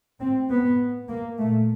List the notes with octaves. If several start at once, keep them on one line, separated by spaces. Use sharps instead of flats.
A2 C4
B3
A#3
A#2 A3